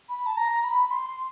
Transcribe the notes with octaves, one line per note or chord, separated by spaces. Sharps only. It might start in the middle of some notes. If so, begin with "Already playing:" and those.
B5
A5
A#5
B5
C6